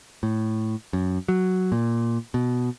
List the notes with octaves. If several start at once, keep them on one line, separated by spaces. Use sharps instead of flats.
A2
F#2
F#3
A#2
B2